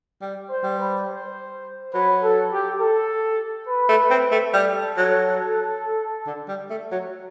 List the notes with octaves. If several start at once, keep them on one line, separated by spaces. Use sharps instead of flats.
G3
C5
G3
B4
C5
F#3 B4
A4
G4
A4
B4
A3
C4
A3
G3 A4
F#3
D3
G3
A3
F#3